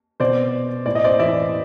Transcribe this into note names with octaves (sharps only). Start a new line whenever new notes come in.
B2 C5 D5
A2 D5
D#5
C5 D5
E3 D5 E5